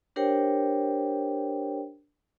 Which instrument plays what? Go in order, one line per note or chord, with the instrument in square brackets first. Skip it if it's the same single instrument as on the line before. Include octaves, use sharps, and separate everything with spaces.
[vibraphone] D4 G4 A#4 C5 C#5 G5